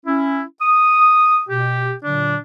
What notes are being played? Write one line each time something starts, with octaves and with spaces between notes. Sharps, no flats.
C#4 E4
D#6
B2 G4
A#2 D3 F#3 D4